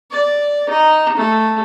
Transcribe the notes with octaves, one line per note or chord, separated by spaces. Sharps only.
D5
D#4
A3